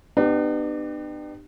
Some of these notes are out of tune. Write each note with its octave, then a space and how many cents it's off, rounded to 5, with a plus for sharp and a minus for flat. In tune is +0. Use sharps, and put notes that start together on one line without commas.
B3 +20 D4 +45 G4 +0